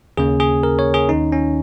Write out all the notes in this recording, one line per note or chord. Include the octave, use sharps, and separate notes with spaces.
D#2 C#3 A#3 C#4 G#4
G#4
A#4
C#5
G#4
D#2 D#3 C#4 D#4
C#4